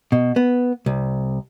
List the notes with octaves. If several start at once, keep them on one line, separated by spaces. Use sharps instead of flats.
B2
B3
C2